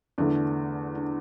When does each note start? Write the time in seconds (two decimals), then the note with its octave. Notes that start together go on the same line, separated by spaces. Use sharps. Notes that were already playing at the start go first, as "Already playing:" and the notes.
0.18 E2 D3 A3 D4
0.95 D4